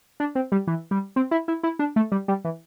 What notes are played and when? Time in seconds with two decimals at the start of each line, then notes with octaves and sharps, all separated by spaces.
0.20 D4
0.35 C4
0.52 G3
0.67 E3
0.91 G3
1.16 C4
1.31 E4
1.48 E4
1.63 E4
1.79 D4
1.96 A3
2.12 G3
2.28 G3
2.44 E3